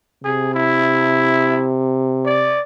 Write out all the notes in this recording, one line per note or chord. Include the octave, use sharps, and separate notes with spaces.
C3 G#4
E4
D5